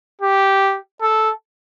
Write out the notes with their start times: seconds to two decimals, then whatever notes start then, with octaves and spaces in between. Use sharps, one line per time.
0.21 G4
1.02 A4